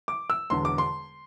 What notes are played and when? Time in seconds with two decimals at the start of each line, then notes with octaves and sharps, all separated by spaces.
0.08 D6
0.30 E6
0.50 E1 E2 D3 C6
0.65 D6
0.78 C6